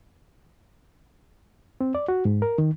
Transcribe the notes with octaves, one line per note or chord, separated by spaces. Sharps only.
C4
D5
F#4
G#2
A#4
D#3